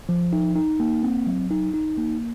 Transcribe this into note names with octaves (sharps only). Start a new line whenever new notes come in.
F3
D#4
D#4
A#3
C4
F#3
D#4
D#4
A#3